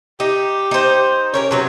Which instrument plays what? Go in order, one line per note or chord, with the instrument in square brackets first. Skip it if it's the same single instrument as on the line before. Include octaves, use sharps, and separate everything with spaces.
[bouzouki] D#4 [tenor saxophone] G4
[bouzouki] D#4 C5
[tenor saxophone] C#4 [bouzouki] G4 A#4 C#5
[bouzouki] C3 F#3 B4